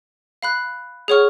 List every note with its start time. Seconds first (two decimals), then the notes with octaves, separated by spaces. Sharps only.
0.43 F5 B5 F#6
1.08 G#4 C#5 F#5 C#6 F6